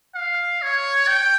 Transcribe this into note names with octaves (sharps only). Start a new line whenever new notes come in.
F5
C#5
G5